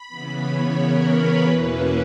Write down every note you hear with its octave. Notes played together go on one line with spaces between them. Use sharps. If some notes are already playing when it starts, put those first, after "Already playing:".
Already playing: B5
C#3 E3 B3
C#5
A#4
B4
E2 B2 A#3 C#4 E4